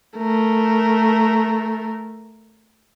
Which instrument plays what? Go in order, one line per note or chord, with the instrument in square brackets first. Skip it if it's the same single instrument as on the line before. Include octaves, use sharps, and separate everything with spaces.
[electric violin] A3 A#4